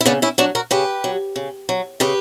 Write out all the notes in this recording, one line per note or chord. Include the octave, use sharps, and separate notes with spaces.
E4
C#3 B3 D4
C#4 E4
F#3 D4 F#4
F#4 A#4
C#3 G4 B4
F#3
C#3
F#3
C#3 G4 B4